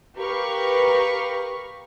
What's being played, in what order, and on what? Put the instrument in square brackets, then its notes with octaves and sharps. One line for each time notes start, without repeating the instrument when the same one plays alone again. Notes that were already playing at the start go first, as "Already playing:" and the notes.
[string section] G4 A#4 B4 F5 C#6